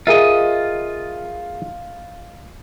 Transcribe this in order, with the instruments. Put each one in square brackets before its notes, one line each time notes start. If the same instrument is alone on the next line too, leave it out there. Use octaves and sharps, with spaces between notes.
[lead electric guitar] F4 D#5 [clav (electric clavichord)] G#4 A#4 E5